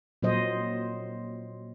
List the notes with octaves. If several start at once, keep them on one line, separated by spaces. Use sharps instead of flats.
A#2 F#3 C5 D#5